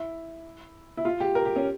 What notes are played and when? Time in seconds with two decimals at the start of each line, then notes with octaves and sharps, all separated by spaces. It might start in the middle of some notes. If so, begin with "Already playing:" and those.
Already playing: E4
0.97 E4
1.05 F4
1.20 G4
1.35 A#4
1.45 G4
1.56 C#4